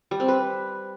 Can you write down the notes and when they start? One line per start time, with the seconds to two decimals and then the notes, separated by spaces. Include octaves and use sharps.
0.11 G3
0.20 C4
0.28 B4